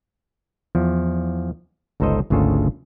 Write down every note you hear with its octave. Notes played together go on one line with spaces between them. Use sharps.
E2 F3
G1 C#2 D#4 A4 C5 D#5
G#1 D2 C#3 F4 G#4 A4